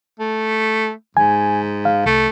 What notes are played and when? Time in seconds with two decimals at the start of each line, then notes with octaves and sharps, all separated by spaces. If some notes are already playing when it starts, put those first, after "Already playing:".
0.20 A3
1.17 G#2 G#5
1.85 F5
2.06 C2 A3